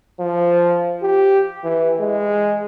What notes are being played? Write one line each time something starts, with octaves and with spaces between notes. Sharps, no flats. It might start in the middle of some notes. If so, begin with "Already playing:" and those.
F3
G4
E3
G#3